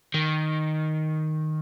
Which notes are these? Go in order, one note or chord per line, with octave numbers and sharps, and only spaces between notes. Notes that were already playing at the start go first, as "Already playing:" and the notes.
D#3